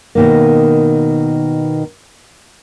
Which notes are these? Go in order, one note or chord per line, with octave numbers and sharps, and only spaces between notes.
B2 D#3 A#3